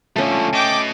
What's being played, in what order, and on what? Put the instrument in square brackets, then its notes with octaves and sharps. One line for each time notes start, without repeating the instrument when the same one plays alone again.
[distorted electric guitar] D3 F3 [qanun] A3 C#4
[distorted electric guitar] D#5 A5 [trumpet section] G5 D6